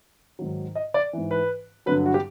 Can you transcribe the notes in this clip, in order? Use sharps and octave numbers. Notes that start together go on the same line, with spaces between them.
G#2 D#3 F#3
D#5
D5
G#2 E3
B4
G2 D3 F#3 B4
F#4
G4